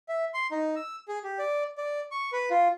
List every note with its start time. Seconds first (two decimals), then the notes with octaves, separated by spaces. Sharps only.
0.09 E5
0.34 C6
0.51 D#4
0.76 E6
1.08 G#4
1.24 G4
1.39 D5
1.78 D5
2.11 C#6
2.32 B4
2.50 F4